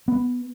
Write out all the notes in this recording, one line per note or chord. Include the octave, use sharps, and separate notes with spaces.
B3